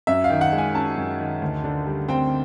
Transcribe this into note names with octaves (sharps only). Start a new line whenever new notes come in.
F#2 E5
F5
D#3
F#5
G#3
G#5
C#4 A5
F#2
D#3
D2
D3
G3
C4 G5